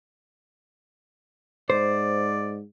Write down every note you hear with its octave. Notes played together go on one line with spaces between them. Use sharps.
G#2 C5 D5